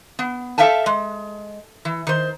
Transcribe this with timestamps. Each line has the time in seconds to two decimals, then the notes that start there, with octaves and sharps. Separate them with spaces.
0.19 B3
0.58 A4 C5 E5 F5 G5 A5
0.86 G#3
1.85 E3
2.07 D#3 C5